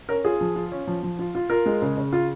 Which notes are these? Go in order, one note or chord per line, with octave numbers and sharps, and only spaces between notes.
C#4 A#4
F4 G#4
F3
F4
C#4
F3
F3
F4
F4
F4 A#4
G#3
C#3
C#3
F4